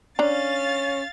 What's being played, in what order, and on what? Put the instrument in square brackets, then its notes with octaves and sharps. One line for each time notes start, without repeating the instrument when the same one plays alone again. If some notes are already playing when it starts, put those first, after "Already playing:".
[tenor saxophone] C#4 [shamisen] D4 A#5 [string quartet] F5 A6